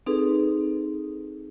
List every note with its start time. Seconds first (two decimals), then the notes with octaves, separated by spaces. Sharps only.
0.06 C4 D#4 G#4 A4 B4